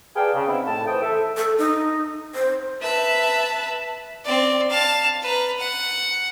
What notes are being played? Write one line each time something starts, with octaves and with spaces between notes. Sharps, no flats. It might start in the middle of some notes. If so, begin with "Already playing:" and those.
G#4 B4 D5 F5 G5 A5
C#3
B3 C4 D#4 E4
A2 A5
E3 A3 C5 G5 D#6
A4 E5
A4
D#4
C5
B4 E5 A5
C4 D5
F5 A5
B4 A#5
F#5